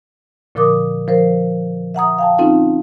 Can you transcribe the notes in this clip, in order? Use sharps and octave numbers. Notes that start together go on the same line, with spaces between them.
A#2 D3 F3 A#4 D6 D#6
F3 A#4 C5
E5 F#5 A#5 D#6
F5 G5 A5
C4 C#4 D#4 F4 A4